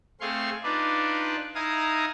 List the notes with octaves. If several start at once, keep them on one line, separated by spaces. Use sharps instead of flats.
A3 C4 G#4 F5 C6 C#6
D4 D#4 F4 B4 D5
D#4 E4 F5 G#5 A#5 D#6